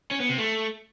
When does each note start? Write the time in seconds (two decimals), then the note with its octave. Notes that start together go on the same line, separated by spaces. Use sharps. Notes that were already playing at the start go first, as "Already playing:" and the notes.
0.11 C#4
0.20 B3
0.29 C3
0.38 A3